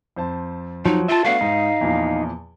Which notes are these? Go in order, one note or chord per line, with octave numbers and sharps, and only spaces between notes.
F2 C5 A5
F3 F#3 D#4
F4 E5 A5
A3 B3 D4 F#4 F5
G#2 D#4
E2 A#2 F3